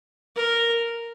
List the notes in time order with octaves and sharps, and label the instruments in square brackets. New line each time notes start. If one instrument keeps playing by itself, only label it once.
[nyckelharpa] A#4